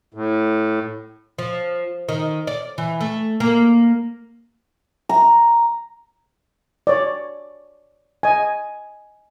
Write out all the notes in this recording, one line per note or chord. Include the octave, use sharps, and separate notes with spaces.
A2
F3
D#3
D5
E3
A3
A#3
A#5
C#5 D5
D#5 G#5